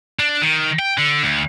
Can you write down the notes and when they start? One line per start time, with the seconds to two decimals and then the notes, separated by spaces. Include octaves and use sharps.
0.19 D4
0.42 D#3
0.79 G5
0.98 D3
1.23 D2